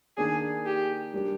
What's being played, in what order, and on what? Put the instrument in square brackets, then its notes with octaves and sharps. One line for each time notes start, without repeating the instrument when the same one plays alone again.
[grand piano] D#3 A#3 D4 [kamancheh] G#4
[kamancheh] G4
[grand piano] G3 D4 G4 A#4